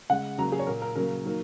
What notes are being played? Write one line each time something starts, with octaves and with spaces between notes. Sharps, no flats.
C#3 G#3 F#5
C#3 F#3 A#3 A#5
G#4
C#5
A#2 A#3 A#4
A#4
C#3 F#3 A#3 A#4
D#3 F#3 A#3